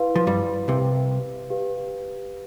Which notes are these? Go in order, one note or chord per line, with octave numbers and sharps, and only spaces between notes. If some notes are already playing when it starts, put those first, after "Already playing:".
Already playing: E4 B4 F5 C6
F3
G2 G3
C2 C3 G4 B4 F5
G4 B4 F5